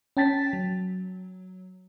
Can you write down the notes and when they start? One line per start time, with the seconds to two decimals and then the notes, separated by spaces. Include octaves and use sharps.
0.17 C#4 G5 A5 A6 B6
0.53 F#3